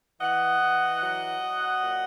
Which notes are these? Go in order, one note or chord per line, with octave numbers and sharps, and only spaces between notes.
E3 D#5 F#5
E3
F#3
F#3
A#2